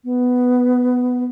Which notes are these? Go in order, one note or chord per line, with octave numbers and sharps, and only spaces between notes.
B3